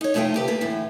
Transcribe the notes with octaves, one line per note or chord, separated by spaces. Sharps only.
D#4 C#5
F2 C3 A3 D#4 F4 G5
D2 G4 B4
A#3 A4 B4
E2 A2 D3 E3